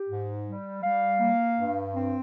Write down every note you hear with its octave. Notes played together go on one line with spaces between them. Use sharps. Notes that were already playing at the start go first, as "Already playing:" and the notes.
Already playing: G4
G#2
G3
G3 F5
A#3
G2
C4